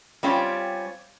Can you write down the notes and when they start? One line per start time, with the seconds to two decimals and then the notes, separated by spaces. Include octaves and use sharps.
0.23 G3 C4 C#4 F4 G4